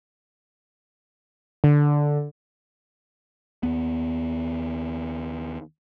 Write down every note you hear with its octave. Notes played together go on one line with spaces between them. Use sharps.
D3
D#2 B3